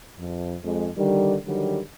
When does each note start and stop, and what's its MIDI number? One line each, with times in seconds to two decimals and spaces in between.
0.18 0.55 41
0.64 0.88 41
0.64 0.88 56
0.97 1.35 50
0.97 1.35 51
0.97 1.35 55
1.46 1.78 50
1.46 1.78 51
1.46 1.78 54
1.46 1.78 55